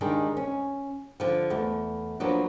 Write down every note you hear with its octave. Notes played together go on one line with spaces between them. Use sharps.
D#2 D#3 G#3 D4
C#4
D3 F3
E2 A3
F3 F#3 A#3 B3 D4